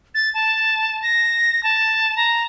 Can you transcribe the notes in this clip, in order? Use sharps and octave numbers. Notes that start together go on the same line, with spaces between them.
A6
A5
A#6
A5
A#5